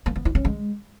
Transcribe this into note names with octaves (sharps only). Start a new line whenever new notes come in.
A#3
B3
E4
C#4
G#3